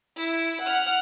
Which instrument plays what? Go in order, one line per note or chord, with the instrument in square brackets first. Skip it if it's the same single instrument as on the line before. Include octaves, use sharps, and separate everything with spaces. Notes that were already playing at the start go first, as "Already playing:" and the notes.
[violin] E4
F#5 F6